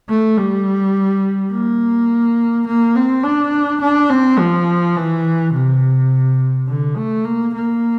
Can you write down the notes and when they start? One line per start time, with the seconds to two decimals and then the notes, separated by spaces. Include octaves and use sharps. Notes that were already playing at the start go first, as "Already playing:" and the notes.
0.09 A3
0.37 G3
1.51 A#3
2.67 A#3
2.95 C4
3.23 D4
3.81 D4
4.10 C4
4.38 F3
4.96 E3
5.53 C3
6.67 D3
6.97 A3
7.24 A#3
7.54 A#3